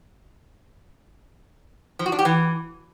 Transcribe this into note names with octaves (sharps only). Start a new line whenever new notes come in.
F3
F#4
D4
G4
E3